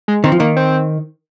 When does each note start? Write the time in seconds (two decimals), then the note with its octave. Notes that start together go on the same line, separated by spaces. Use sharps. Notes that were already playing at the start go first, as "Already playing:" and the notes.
0.08 G#3
0.24 D#3 C4
0.32 F3
0.40 D#3 A#3
0.57 C4